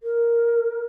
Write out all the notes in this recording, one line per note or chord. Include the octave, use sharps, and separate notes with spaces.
A#4